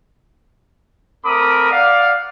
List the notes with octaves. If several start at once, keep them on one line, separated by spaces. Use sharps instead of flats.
A3 C4 A#4 B5 D6 D#6
D5 F5 F#5